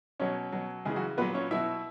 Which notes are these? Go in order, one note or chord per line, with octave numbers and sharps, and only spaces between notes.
B2 F#3 C#4 C#5
B2 F#3
C#3 E3 G#3 G#4
F#3 F#4
A#2 F#3 B3 B4
C#4 C#5
B2 F#3 E4 E5